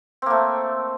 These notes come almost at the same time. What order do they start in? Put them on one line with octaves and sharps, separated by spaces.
C4 A#3 A3